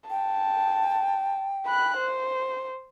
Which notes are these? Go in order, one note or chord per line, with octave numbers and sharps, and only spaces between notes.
G5 A5
B5 F#6
C5